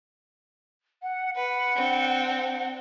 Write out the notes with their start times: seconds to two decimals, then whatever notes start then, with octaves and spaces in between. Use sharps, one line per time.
1.02 F#5
1.36 B4 F#5
1.76 C4 D4